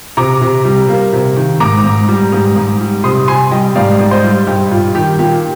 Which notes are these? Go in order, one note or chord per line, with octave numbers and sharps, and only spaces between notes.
C3 A#5 D6
C3
G3
A#3
C3
D#3
G#2 A#5 D6
G#2
G3
G#2
G#2
G3
C3 C6 D#6
C3 G#5 C6
G3 D#5 G5
G#2 D5 F5
G#2
C5 D#5
G3
G2 G4
G2 F4
D#3 G4
A#2 G4